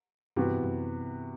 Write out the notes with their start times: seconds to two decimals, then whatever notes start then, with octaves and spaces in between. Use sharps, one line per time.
0.36 G2 C3 E3 B3 F#4
0.64 G2
0.69 F#2
1.02 G2